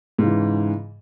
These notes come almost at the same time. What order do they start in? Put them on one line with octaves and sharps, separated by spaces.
G#2 C#3 E3